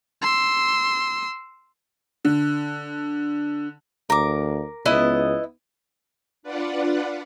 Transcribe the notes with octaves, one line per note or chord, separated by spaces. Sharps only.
C6 E6
D3
D2 A#4 D6
C#2 B3 E4 D#5
D4 F4 B4 D5 F#5